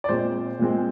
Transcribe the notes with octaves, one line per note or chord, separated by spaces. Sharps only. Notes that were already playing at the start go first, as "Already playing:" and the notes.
D5
A#2 G#3 C4 C5
A#2 G#3 C4